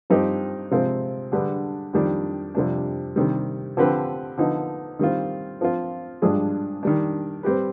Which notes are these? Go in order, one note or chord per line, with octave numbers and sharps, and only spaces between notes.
G2 F3 C4 D#4 G4
C3 F3 G#3 C4 F4
D3 G3 D4 G#4 B4
F2 D#3 G3 D4
F2 C3 G3 D4
C3 D#3 G3
D3 F3 C4 G4 B4
D3 F3 B3 D#4
D#3 G3 C4 F4
F3 C4 F4
G2 F3 G#3 D4 G#4
D#3 G3 D4
G3 C4 G4 B4